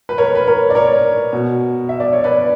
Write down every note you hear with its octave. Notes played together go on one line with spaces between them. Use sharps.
B4
A#4 C#5
B4
A#4 C#5
D5
A#4 C#5
B2
E5
D5
C#5
B4 D5